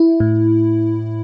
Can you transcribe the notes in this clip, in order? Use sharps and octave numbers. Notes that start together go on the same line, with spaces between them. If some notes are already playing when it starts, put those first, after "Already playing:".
Already playing: E4
A2